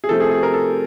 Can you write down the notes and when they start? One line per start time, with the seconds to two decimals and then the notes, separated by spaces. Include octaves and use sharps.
0.04 G#4
0.09 C3 F3 A3 C4 A4
0.20 G#4
0.31 G#4
0.43 A#4
0.53 A4